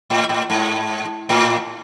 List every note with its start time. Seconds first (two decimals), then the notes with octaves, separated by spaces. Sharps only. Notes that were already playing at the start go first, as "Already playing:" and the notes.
0.10 A2
0.29 A2
0.50 G#2
1.29 A2